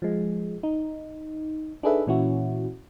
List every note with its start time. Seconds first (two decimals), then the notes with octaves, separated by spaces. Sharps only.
0.02 F3 G#3
0.63 D#4
1.83 D4 D#4 G#4 A4 B4 E5
2.07 A#2 E3 C#4 E4 F#4